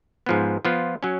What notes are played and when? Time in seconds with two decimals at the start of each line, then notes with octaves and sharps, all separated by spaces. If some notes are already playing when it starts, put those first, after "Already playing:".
0.26 G#2 F3 B3
0.65 F3 B3 F4
1.03 F#3 C#4